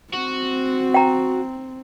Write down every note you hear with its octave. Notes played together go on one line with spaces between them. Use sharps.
C4 F#4
G5 A#5